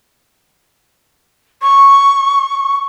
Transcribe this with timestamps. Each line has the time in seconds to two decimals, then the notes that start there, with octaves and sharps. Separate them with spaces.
1.62 C#6